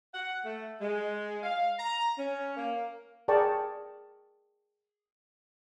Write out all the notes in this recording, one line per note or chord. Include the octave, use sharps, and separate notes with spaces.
F#5
A3
G#3
F5
A#5
C#4
A#3
G#4 A#4 D5 G5 A5 C#6